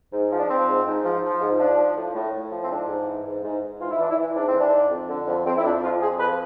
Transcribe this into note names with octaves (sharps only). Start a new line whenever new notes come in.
G#2
F3
D4
F3 C4
G#2
G#2
F3
F3
G#2
F3 D4
F3
A2
A2
A2
F3
C4
G#2 D4
G#2
E3
G#2
G#2
G#2
E3 F4
E4
E3 D4
E4
E3
G#2 D4
C4
E3 D4
G#2
F2
D3
F2
F2 C4
E4
F2 D4
F3 F4
F2 G#4
F3 B4